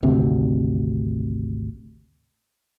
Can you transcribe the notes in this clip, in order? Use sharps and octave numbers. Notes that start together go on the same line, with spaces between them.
G#1 D2 C3